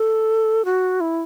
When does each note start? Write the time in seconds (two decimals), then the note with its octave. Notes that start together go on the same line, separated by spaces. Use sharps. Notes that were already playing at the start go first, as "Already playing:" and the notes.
Already playing: A4
0.65 F#4
1.01 E4